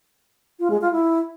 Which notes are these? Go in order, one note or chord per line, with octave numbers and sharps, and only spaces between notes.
F4
G#3
F4
E4